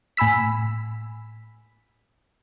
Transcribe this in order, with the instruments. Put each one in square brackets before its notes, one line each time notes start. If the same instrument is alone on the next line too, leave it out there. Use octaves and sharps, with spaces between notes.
[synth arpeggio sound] A2 G#5 B5 E6 B6